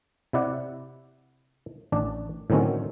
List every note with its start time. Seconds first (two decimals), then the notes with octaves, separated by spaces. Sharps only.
0.33 C3 E4 D5 F#5
1.92 A1 D4 D5
2.50 A2 D3 D#3 F#3 C4 C#4